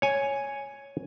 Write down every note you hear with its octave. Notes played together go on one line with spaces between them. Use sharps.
C#5 G#5